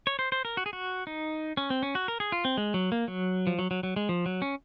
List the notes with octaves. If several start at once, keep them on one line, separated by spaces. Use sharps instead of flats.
C#5
C5
C5
A#4
F#4
G#4
F#4
D#4
C#4
C4
C#4
F#4
A#4
G#4
F4
C4
G#3
F#3
A#3
F#3
F3
F#3
F#3
F#3
G#3
F3
F#3
C#4